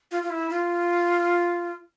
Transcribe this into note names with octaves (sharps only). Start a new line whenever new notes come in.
F4
F4
E4
F4